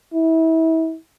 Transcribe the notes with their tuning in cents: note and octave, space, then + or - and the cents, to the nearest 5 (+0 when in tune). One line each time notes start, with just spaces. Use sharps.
E4 -30